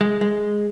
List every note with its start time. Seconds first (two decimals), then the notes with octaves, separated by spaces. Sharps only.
0.01 G#3
0.21 G#3